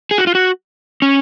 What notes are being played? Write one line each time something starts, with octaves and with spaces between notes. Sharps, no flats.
G#4
F#4
F4
F#4
C#4